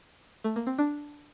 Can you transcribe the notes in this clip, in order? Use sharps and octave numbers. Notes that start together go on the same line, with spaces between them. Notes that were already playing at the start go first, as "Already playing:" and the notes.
A3
A#3
C4
D4